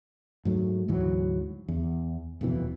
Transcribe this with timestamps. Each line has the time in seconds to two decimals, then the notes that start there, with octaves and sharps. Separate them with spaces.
0.45 G#2 F#3 A3
0.88 D2 G#2 E3 F#3
1.68 E2
2.41 D#1 F2 B2 E3